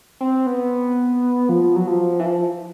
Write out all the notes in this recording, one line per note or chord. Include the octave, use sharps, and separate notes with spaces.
C4
B3
F3
F#3
F3
E3
F3